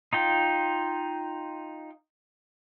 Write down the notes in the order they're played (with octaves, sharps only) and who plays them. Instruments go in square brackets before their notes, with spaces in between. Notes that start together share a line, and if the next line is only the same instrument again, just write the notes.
[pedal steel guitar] D#4 F4 G5